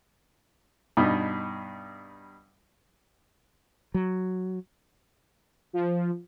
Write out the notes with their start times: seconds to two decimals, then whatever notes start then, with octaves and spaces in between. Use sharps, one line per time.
0.97 G2 B2 D#4
3.94 F#3
5.73 F3